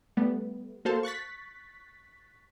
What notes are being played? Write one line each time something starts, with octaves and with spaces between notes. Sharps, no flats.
G3 A3 B3
A#3 F#4 A4 C5 F5 A5
C#6 F#6 A6 B6